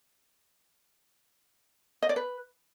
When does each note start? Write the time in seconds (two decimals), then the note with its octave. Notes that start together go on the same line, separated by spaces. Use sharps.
2.02 D#5
2.09 D5
2.16 B4